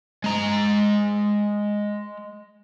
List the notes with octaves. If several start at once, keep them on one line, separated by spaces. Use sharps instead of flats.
G#3 A#5